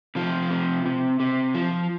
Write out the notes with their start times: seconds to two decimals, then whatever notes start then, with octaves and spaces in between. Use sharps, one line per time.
0.15 C3 F3
0.51 C3
0.86 C3
1.20 C3
1.54 F3